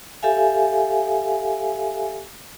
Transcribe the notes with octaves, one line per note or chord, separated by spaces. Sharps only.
G4 A4 E5 F5 G#5